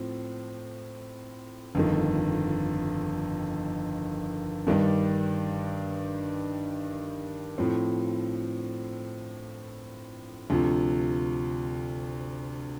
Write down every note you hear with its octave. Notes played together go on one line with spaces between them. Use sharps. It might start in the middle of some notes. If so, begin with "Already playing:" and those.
Already playing: A2 F3 C4
G1 F2 D#3
G2 D#3 G3 D4
A2 F3 C4
D2 C3 F3